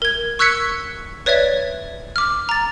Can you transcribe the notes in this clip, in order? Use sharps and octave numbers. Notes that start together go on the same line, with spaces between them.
A#4 G#6
C#6 E6 F#6 G#6 B6 C#7
B4 C#5 D5 E5 G#6
D6 F6
A#5 A6